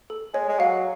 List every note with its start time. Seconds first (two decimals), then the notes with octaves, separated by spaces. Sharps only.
0.10 A4
0.34 G#3 C#5
0.49 G#3
0.60 F#3 F5